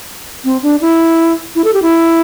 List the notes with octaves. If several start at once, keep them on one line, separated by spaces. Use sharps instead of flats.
C4
D4
E4
E4
A4
G4
E4